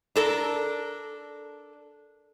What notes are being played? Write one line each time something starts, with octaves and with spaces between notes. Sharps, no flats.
D4 A4 A#4